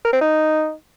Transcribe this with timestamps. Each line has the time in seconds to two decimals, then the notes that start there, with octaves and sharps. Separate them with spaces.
0.05 A#4
0.13 C4
0.21 D#4